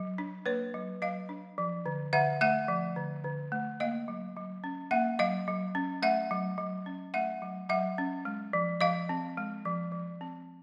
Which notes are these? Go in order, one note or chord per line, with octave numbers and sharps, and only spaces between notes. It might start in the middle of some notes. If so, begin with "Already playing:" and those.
Already playing: F#3
D4
A#3 B4 C#5
F#3
F#3 D#5 F5
D4
F3
D3
D3 E5 F#5
A3 E5 F#5
F3
D3
D3
A3
A#3 D#5 F5
F#3
F#3
C#4
A#3 E5 F#5
F#3 D#5 F5
F#3
C#4
A3 E5 F#5
F#3
F#3
C#4
A3 E5 F#5
F#3
F#3 E5 F#5
C#4
G#3
F3
F3 D#5 F5
C4
G#3
F3
F3
C4